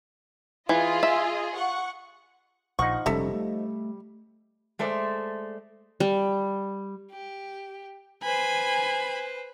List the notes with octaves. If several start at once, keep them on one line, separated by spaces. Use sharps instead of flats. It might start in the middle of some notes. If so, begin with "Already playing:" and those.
E3 F4 G#4 D#5
E5
F#5 C#6
A#1 F3 D#4 F#5 C#6
F1 C3 G3 C#4 A4 E5
A3
G#3 A3 C5 D5
G3
G4
B4 C5 G#5 B5